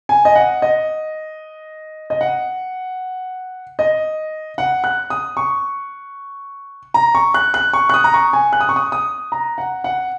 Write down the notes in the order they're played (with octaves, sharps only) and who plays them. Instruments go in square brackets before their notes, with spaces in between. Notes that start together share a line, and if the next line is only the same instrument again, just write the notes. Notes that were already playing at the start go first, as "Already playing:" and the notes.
[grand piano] G#5
D#5
F#5
D#5
D#5
F#5
D#5
F#5
F#6
D#6
C#6
A#5
C#6
F#6
F#6
C#6
F#6
D#6
A#5
C#6
G#5
F#6
D#6
C#6
D#6
D#6
A#5
F#5
F#5